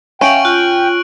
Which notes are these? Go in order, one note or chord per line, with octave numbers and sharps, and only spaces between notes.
C#4 E5 F5 G5 C#6 D7 F#7
F4 F#6